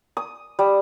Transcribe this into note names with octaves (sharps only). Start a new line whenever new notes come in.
D#6
G3